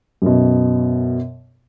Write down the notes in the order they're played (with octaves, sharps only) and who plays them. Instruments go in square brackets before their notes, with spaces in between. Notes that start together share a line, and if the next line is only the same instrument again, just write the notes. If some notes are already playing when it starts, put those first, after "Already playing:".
[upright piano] F#2 B2